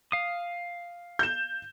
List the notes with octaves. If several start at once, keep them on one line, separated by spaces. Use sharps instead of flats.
F5 D#6
G6 E7